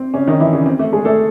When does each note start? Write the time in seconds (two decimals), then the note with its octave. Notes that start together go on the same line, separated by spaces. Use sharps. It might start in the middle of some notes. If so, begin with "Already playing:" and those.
Already playing: C4
0.14 C#3 C#4
0.27 D#3 D#4
0.40 E3 E4
0.53 C#3 C#4
0.66 C4
0.79 A3
0.93 G#3 G#4
1.05 A3 A4